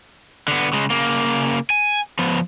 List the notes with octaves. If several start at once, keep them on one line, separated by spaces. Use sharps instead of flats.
D3 B3
C#3 G#3
C#3 A#3
G#5
F3 B3